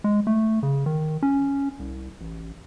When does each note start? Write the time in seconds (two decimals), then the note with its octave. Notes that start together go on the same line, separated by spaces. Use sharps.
0.04 G#3
0.27 A3
0.63 C#3
0.86 D#3
1.23 C#4
1.79 C2
2.21 A1